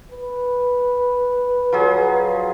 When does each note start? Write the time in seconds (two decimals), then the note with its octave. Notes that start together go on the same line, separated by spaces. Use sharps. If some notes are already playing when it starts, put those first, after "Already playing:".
0.11 B4
1.72 F3 F#3 G#4